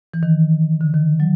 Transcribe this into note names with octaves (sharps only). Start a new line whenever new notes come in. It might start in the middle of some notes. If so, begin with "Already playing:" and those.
E3
D#3
D3
D#3
F#3